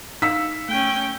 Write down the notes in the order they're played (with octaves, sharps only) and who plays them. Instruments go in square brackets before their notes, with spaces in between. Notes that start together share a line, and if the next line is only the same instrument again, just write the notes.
[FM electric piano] D#4 F5 C#7 [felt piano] E6 B6
[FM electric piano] A3 [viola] C#4 G5